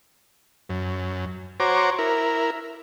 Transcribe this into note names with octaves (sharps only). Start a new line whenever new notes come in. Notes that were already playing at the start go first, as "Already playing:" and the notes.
F#2
F#4 C5 C#5 A#5 D6
E4 A#4